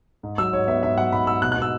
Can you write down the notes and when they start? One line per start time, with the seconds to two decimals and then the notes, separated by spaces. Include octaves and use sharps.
0.23 G#2
0.38 F#3 E6
0.53 G#2 C#5
0.68 B3 E5
0.83 G#2 E5
0.98 F#3 F#5
1.12 G#2 B5
1.27 G#2 E6
1.42 B2 F#6
1.52 F#6
1.57 B2
1.62 E6